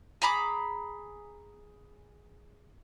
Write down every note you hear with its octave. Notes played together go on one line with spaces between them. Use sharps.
G#4 A#5 B5 D6